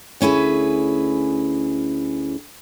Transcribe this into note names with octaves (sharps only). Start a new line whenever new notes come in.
D2 C#4 E4 G#4 B4